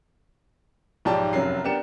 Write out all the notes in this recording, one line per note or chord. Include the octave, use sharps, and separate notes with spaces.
B1 G#2 F3 G4 D5 A5
F1 F#2 F#3 C7
B3 D4 G4 A#4 C#7 E7